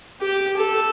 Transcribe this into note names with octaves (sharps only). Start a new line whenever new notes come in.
G4
A4